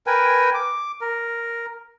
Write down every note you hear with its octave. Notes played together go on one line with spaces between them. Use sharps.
A#4 B4 G5 G#5
D6
A#4